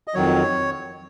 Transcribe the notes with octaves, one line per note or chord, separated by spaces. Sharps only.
D#5
F2 D#3 F#3 C#5